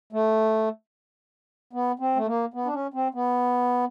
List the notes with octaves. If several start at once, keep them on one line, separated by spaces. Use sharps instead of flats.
A3
B3
C4
A3
A#3
B3
D4
C#4
C4
B3